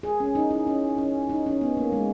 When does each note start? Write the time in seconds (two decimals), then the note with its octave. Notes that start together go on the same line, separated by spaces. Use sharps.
0.03 G#4
0.20 C#4
0.35 D#4
0.51 E4
0.67 C#4
0.98 C#4
1.29 D#4
1.46 C#4
1.61 B3
1.77 A#3
1.92 G#3